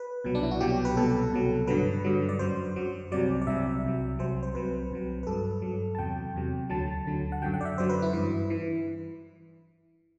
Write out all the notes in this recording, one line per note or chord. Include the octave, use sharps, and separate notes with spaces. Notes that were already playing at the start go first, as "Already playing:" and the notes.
Already playing: B4
C2 B2 F#3
D4
E4
F#4
C2 B2 F#3 G4
B4
C2 B2 F#3 A4
C2 B2 F#3
G2 D3 F#3 B4
G2 D3 F#3
D5
F#2 F#3 C5
F#2 F#3
C2 C3 F#3 D5
D5
C2 C3 F#3 E5
C2 C3 F#3
C2 C3 F#3 C5
C5
C2 C3 F#3 B4
C2 C3 F#3
B4
G2 F#3 A4
G2 F#3
A5
E2 C3 F#3 G5
E2 C3 F#3
D2 D3 F#3 A5
D2 D3 F#3
F#5
F#2 D3 F#3 G5
F#5
D5
E5
F#2 D3 F#3 C5
B4
E4
G2 E3
E3